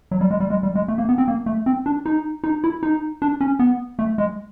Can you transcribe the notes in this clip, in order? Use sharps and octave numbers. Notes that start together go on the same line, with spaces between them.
F#3
G3
G#3
G3
G#3
G3
G#3
A3
A#3
B3
C4
A#3
A3
C4
D4
D#4
D#4
E4
D#4
D4
C#4
B3
A3
G#3